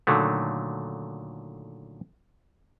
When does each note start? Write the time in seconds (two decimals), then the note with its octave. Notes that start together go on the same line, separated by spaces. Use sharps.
0.07 A#2 D3 D#3 F#3 A3